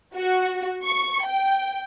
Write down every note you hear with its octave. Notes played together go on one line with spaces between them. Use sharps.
F#4
C#6
G5